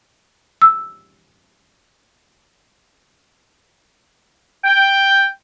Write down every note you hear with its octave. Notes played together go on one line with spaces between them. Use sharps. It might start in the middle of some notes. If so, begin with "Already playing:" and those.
E6
G5